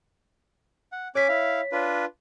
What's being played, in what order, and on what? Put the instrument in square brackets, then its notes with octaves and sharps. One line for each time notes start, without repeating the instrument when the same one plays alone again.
[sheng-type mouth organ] F#5
[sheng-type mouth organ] C#4 G#5 D6 [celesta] C#5 B6
[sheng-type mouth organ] E4 F5
D4 F4 B4